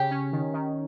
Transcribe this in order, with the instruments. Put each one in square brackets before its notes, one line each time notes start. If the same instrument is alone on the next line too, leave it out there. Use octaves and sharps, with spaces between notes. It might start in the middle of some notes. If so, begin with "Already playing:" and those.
Already playing: [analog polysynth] C#3 [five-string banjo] G4
[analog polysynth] C#4
D#3
D#3